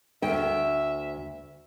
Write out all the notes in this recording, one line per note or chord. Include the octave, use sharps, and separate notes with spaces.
D2 E5 G5